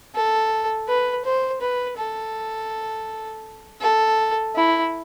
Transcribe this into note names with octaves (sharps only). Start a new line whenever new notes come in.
A4
B4
C5
B4
A4
A4
E4